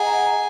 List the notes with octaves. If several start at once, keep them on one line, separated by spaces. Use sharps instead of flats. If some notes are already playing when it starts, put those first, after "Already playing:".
Already playing: G#4 D#5 F#5 A#5